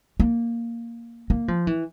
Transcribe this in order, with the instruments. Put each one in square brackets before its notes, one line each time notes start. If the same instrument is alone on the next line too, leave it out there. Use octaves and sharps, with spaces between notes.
[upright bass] A#3
A#3
F3
E3